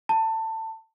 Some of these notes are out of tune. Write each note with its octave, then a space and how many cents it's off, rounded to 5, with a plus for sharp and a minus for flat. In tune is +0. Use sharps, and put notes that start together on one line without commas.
A5 +20